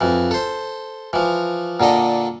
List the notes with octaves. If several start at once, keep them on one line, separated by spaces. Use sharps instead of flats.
F2 E3
A4 C5
E3 F3
A#2 D3 A4 D#5